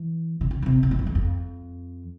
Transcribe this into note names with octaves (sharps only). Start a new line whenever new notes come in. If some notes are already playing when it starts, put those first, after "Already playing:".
Already playing: E3
C3
D3
D3
C3
C3
A2
G2
E2
F2